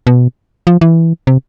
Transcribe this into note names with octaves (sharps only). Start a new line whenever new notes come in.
B2
F3
E3
C3